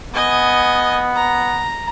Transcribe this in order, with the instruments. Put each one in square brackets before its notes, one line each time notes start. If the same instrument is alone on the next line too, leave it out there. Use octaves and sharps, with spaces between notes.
[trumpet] B3 [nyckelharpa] D#5 G#5
[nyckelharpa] A#5